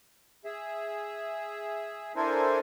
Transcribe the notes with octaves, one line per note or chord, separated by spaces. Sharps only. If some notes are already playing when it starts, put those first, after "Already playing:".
G#4 E5
D4 E4 A4 A#4 C5 G#5